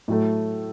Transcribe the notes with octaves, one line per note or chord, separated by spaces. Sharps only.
A2 F#3 A3